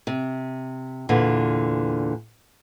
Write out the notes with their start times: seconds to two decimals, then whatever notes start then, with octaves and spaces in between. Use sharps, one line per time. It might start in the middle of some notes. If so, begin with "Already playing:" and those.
0.07 C3
1.09 E2 A#2 D3